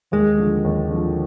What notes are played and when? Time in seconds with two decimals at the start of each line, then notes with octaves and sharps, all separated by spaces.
0.12 D#2 G#3
0.38 D3 F3
0.64 D#2
0.90 D3 F3